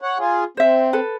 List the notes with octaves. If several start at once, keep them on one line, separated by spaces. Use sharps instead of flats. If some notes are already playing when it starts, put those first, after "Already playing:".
C#5 F#5
F4 G#4
C4 C5 E5
A4 B4